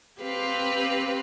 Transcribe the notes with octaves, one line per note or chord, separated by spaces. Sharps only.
C4 G4 B4 F5